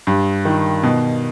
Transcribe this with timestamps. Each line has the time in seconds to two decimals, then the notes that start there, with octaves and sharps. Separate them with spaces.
0.07 G2
0.45 D#3
0.83 B2